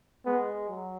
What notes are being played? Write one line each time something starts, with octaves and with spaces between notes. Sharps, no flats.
G#3 B3
F#3